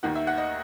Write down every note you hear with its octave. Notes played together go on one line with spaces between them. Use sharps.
D#2 D#3 F#5
E5
F#5
D#5